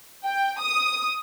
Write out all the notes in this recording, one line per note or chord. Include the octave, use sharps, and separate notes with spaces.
G5
D#6